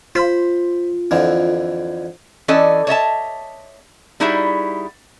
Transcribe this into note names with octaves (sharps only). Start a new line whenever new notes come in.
F4 C5 B5
F2 D3 E3
E3 C#4 A4 D5 D#5
C#5 D#5 E5 A5
G3 D#4 E4 F#4 G#4 E5